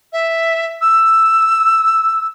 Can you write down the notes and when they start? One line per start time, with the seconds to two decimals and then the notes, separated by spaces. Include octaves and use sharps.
0.13 E5
0.81 E6